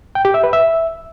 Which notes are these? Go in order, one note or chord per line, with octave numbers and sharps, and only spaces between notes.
G5
G4
E5
B4
E5